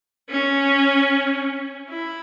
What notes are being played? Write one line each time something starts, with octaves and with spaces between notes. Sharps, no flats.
C#4
E4